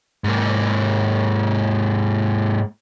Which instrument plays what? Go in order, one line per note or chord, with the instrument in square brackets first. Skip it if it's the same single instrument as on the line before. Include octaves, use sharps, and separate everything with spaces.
[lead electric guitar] G#2 A#3